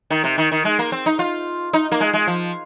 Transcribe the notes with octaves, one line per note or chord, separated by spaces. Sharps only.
D#3
C3
D#3
D#3
G#3
A#3
C4
D#4
F4
D#4
A#3
G#3
G#3
F3